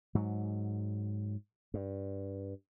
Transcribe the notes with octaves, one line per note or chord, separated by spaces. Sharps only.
G#2 F#3
G2